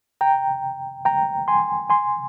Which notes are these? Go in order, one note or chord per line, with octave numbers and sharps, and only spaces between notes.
G5 A#5
G5 A#5
G#5 C6
G#5 C6